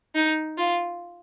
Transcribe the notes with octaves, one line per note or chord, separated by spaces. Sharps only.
D#4
F4